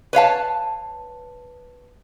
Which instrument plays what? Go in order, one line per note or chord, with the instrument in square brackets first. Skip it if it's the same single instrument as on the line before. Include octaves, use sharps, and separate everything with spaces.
[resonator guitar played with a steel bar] B4 C#5 F5 A5